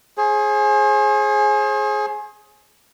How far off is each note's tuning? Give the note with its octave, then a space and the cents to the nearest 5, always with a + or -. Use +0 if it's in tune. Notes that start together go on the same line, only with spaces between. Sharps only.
G#4 +15 C5 +45